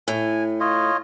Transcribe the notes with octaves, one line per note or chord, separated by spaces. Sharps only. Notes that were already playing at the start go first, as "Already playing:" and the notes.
A2 G#5
F4 C#5 D#5